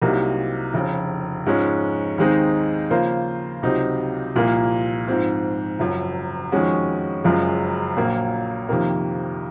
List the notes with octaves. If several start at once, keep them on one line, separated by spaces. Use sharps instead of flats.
C2 C3 F#3 A#3 D#4
F1 F2 C#3
G#2 F3 G#3 C#4
D#2 D#3 G#3 C4 D#4
C#3 F3 A#3 F4 C5
C#2 C3 F#3 C4 D#4
C2 A#2 F3 A#3
G#2 F3 C4
F#1 F#2 F3
F2 D#3 G#3 C#4 F#4
F#1 F#2 C#3 F3 G#3
A#1 A#2 F#3 A#3
F2 C3 D#3 A#3